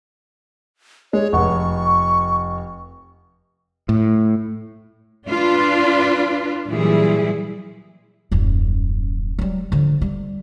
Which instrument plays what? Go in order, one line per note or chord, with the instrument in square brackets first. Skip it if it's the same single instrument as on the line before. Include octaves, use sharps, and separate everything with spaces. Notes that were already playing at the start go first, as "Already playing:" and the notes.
[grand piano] G#3 [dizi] C#5
[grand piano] F1 F#5 [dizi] C#6
[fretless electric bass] A2
[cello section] D4 F4 B4
A#2 E3 F#3 G3 E4 G#4
[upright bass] D#1 F#2
F#3 G3
D3 F3
G3